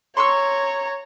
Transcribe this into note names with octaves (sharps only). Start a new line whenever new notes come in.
C#5 A#5 C6 C#6 E6